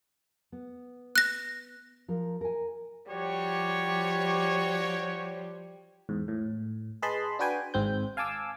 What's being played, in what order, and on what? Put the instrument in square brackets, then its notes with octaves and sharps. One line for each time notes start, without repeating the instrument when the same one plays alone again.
[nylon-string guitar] B3
[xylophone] F#6 A#6
[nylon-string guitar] F3 A#4
A#4 G#5
[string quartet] F3 G3 [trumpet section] F#4 G4 C#5
[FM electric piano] E2 G#2
A2
G#4 B4 D#5 A5 B5 C6
D4 F#4 B4 G5 G#5
G#1 G#2 C4 G6
F5 G#5 A5 D6 E6